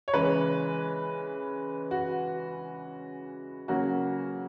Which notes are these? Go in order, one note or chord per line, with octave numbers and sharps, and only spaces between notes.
C#5
C#3 E3 G#3 C#4 B4
F#4
C#3 F#3 A#3 C#4 F#4